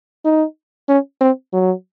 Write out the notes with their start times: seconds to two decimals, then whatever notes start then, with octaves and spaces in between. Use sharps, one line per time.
0.25 D#4
0.88 C#4
1.21 C4
1.53 F#3